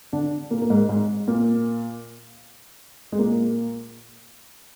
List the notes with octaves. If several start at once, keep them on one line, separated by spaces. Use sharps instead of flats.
D3 D4
A#2 A#3
A#3
G#2 G#3
G#2 G#3
A#2 A#3
G#3
A#2 A#3